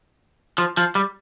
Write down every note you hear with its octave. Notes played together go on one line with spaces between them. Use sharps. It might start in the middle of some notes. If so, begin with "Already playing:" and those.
F3
F3
G3